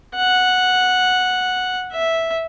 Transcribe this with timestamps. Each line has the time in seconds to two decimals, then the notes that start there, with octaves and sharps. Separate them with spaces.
0.15 F#5
1.93 E5